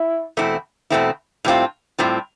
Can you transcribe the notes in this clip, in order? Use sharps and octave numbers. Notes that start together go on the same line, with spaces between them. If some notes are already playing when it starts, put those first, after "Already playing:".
Already playing: E4
E2 B2 A3 C4 E4
E2 B2 A3 C4 E4
A2 G3 C4 F4
A2 G3 C4 F4